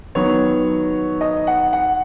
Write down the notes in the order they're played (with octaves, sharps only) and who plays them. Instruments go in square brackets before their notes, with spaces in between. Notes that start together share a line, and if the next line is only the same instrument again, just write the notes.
[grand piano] D#3 F#3 B3 C#5
D#5
F#5
F#5